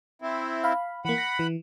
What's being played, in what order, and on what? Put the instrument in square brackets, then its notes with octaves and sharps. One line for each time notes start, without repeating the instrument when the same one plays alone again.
[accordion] C4 E4
[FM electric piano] F5 B5
[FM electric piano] E3 A#3 [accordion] F#5 B5
[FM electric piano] A#6
E3